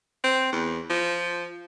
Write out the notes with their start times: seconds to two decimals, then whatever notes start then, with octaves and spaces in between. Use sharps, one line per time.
0.24 C4
0.52 E2
0.90 F3